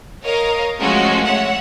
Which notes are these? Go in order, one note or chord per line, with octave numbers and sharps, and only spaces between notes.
A#4 C#5 D#5 F5 A#5
F3 G#3 A3 C#4 F4 F#4
C#5 E5 F#5